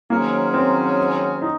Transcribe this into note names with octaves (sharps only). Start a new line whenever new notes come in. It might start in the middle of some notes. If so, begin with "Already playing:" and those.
D#3 F#3 A#3 C#4 G#4 C5
C4
D#4